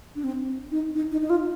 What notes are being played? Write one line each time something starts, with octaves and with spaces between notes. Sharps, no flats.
D4
C4
D#4
D#4
D#4
D#4
F4